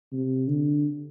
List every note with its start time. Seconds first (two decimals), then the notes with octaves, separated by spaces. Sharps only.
0.13 C3
0.49 D3